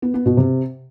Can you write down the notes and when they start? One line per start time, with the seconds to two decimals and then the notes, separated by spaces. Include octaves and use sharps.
0.02 B3
0.14 B3
0.26 B2
0.37 C3